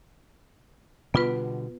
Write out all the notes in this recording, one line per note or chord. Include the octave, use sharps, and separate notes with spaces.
B2 D3 G3 B3 F4 B4